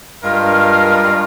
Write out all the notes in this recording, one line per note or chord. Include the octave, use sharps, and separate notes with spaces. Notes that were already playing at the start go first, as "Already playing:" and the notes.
G2 G#3 F4 A#4